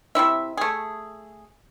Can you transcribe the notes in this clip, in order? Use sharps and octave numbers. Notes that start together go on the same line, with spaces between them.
C3 C#4 E4 E5
A3 G#4